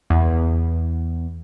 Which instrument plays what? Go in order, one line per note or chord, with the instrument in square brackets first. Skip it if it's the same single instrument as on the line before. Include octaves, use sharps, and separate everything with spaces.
[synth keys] E2